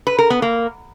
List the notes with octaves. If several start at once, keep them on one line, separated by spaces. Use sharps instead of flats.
B4
A#4
B3
A#3